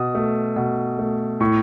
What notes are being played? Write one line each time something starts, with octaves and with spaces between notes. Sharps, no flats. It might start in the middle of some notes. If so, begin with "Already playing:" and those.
Already playing: B2 D#6
A3
B2
A3
A2 C#6